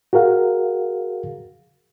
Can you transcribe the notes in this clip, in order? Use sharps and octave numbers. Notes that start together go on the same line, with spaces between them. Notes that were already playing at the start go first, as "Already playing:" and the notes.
F#4 G#4 A#4 F5 F#5